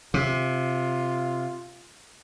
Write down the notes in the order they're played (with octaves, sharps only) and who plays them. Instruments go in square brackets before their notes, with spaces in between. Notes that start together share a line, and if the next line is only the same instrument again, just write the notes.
[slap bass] C3 [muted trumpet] F4